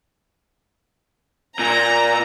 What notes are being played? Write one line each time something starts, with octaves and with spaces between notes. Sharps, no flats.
A#2 A#5